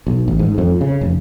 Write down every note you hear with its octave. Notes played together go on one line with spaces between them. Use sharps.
B1
A1
G#2
F2
C#3
F1